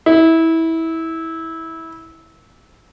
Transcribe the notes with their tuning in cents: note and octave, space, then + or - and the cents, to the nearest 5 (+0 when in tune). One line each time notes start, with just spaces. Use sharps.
E4 -20